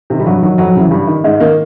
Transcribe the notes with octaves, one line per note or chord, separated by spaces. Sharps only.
C3 D#3
G3
G2 F#3
D#3 F#3
F2 F#3
C#3 E3
G2 G3
D#3
G#2 G#3
D#3 A#3